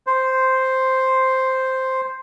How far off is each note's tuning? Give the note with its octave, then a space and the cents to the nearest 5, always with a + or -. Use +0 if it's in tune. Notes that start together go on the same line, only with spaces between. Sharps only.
C5 +0